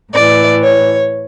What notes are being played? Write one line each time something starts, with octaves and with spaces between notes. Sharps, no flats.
A2 E3 D5
C#5